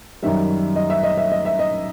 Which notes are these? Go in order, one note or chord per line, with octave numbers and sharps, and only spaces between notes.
F#2 D#3 G3 E5
D#5
E5
D#5
E5
D#5
E5
D#5